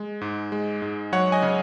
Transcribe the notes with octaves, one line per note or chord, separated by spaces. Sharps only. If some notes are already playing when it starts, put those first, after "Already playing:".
Already playing: G#3
G#2
G#3
G#2
F#3 C#5 F#5
D#5 G#5
C#3